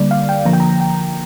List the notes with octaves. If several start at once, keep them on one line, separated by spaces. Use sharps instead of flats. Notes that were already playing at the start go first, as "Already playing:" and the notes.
Already playing: D3 G3 A#3 D5
F5
G5
D3 F3 A#3 A#5
G5
A#5
G5